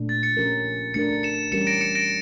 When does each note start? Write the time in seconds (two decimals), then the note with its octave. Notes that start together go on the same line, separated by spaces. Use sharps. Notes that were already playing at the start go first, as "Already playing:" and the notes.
Already playing: A#2 A3 D4
0.09 A6
0.23 A6 C#7
0.37 F3 C#4 G4 A#4
0.94 A3 D4 G4 A#4 A6 C#7
1.23 C#7 E7
1.52 E3 G3 C#4 G4 A#4 C#7 E7
1.67 A#6 D7
1.81 C#7 E7
1.95 A#6 D7